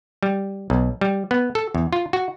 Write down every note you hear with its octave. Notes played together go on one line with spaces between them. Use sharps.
G3
B1
G3
B3
A4
E2
F4
F#4